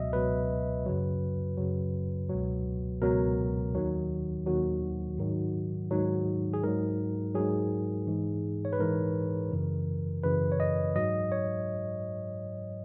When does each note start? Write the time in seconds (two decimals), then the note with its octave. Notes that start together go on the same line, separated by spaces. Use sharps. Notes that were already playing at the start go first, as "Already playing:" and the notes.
Already playing: C#2 B2 F#3 D#5 E5
0.13 C#2 B2 F#3 B4
0.86 F#2 C#3 F#3
1.57 F#2 C#3 F#3
2.29 C#2 B2 F#3
3.02 C#2 B2 F#3 A#4
3.75 D#2 D#3 F#3
4.46 D#2 D#3 F#3 F#4
5.18 G#2 D#3 F#3
5.91 G#2 D#3 F#3
6.53 G#4
6.64 G#2 F#3 A#4
7.35 G#2 F#3 G#4
8.07 G#2 E3
8.65 C#5
8.73 B4
8.79 G#2 E3 A#4
9.51 F#2 C#3 E3
10.24 F#2 C#3 E3 B4
10.52 C#5
10.60 D#5
10.96 G#2 F#3 D#5
11.32 C#5